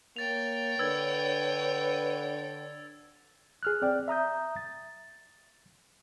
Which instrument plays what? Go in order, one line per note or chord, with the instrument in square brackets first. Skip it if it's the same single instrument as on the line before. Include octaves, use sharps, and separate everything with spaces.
[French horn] A#3 [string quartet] C#5 G5 [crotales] A6 F7
[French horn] D3 [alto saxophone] B4 [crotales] E6 G#6
[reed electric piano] G#4 F6 F#6
C4 D5 G5
E5 A#5 D#6 G6
A6